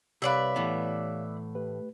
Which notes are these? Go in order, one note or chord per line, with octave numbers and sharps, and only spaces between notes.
C2 G4 B4 C#5 D5 E5 F5
A2 E3 B3
A3 G4 B4